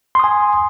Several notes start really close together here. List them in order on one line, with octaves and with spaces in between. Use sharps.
C6 D#6 G#5